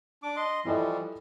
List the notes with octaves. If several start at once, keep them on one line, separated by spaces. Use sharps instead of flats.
D4 D6
D#5 C6
E3 F3 G3 E4 A4 D#5